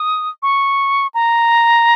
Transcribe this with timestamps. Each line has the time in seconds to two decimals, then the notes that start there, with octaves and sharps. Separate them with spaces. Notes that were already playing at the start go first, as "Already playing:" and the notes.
Already playing: D#6
0.42 C#6
1.14 A#5